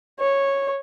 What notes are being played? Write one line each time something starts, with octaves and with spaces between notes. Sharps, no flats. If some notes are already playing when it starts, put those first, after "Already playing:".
C#5